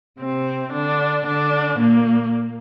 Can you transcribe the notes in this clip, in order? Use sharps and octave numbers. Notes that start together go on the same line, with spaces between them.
C3 C4
D3 D4
D3 D4
A#2 A#3